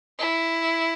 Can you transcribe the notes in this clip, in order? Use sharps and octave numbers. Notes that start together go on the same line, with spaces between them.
E4